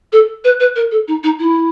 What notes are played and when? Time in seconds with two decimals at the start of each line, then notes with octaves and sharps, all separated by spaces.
0.12 A4
0.44 B4
0.60 B4
0.76 A#4
0.91 A4
1.08 D#4
1.23 D#4
1.40 E4